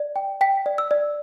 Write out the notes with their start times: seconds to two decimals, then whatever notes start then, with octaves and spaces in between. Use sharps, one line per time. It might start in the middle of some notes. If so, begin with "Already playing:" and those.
Already playing: D5
0.16 G5
0.41 G5 B6
0.66 D5
0.78 E6
0.91 D5